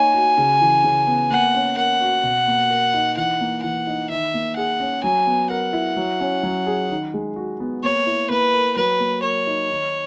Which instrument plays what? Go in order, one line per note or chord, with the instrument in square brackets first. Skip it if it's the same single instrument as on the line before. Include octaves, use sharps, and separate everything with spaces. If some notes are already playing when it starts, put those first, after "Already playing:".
Already playing: [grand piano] A#3 D#4 C#5 [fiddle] G#5
[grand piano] F#4
C#3
E3
C#3
B3
[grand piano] A#3 [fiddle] F#5
[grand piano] C#4
[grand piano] A#4 [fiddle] F#5
[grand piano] F#4
B2
A#3
A#4
D#4
[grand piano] E3 [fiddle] F#5
[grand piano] A#3
[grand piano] E3 [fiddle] F#5
[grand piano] D#4
[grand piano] D#3 [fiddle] E5
[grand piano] A#3
[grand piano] G#4 [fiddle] F#5
[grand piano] C#4
[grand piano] F#3 [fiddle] G#5
[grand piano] B3
[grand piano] A#4 [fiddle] F#5
[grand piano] E4
F#3
C#4
F#3
G#4
D#3
G#3
F#4
B3
[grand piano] A#3 [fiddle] C#5
[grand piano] E4
[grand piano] A#3 [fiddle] B4
[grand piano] A#4
[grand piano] F#3 [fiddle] B4
[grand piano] A#3
[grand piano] A#4 [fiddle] C#5
[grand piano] D#4
D#3